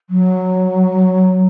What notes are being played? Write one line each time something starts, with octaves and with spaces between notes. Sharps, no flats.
F#3